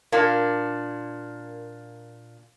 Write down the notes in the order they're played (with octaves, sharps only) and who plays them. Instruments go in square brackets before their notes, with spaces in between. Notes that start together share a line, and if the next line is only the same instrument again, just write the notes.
[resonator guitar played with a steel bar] A#2 A#3 D4